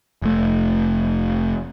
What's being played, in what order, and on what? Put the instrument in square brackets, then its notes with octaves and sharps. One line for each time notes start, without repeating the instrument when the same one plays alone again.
[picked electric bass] F1 A3